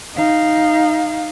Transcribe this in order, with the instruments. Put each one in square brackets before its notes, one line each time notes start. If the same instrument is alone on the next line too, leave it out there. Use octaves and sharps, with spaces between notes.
[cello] D#4 F5